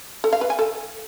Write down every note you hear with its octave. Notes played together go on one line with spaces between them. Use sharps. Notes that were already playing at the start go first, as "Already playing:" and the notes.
A4
F5
B4
G#5
A4